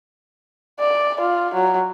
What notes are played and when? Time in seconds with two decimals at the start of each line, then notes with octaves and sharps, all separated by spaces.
0.81 D5
1.21 F4
1.55 F#3